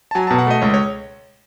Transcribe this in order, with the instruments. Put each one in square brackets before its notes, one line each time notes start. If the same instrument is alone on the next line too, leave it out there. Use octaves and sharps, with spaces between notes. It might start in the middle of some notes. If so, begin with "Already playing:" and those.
[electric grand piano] A5
[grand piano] F#3 [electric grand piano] G#5
[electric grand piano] A5
[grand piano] B2
[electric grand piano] F#5
[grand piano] A3 [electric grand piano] D#5
[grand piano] C#2 [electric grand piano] C#5
[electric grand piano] C#5